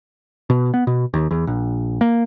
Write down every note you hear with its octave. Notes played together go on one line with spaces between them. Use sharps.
B2
B3
B2
D#2
E2
A#1
A#3